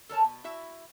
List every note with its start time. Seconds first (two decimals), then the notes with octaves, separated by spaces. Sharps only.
0.09 A4 A#4 C#5 A5
0.24 B2
0.44 E4 F#4 E5